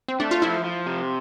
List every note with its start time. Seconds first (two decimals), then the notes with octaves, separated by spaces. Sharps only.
0.08 C4
0.20 A3 D4
0.31 F4
0.42 F3 E4
0.65 F3
0.86 C3